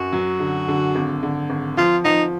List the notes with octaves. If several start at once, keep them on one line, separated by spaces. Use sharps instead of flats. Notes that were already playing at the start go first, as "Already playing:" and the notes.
Already playing: F#2 F#4
F#3
D3
D3
G#1
D3
G#1
F3 F4
F3 D#4